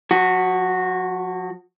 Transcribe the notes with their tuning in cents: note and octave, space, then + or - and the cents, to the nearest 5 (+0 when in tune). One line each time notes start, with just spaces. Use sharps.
F3 +40 F#4 +0